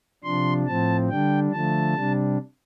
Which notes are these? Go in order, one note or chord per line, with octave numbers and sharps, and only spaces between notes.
C3 F3 D4 C6
A2 F3 C4 A5
D3 G3 D4 G5
D3 F3 A3 A5
C3 G3 D4